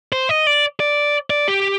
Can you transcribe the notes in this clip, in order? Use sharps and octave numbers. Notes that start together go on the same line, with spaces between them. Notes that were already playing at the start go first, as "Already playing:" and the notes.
C5
D#5
D5
D5
D5
G4